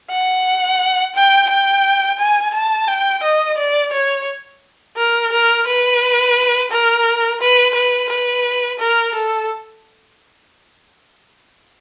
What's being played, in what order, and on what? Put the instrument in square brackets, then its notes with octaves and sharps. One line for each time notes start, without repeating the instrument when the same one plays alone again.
[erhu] F#5
G5
G5
G#5
A5
G5
D#5
D5
C#5
A#4
A#4
B4
A#4
B4
B4
B4
A#4
A4